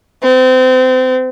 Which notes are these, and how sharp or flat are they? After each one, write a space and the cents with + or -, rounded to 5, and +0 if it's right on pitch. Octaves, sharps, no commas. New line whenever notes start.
C4 -30